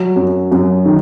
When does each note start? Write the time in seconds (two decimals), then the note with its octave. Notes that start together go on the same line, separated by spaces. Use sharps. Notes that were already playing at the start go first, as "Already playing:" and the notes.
Already playing: F#3
0.16 F#2
0.52 F#2
0.86 D#3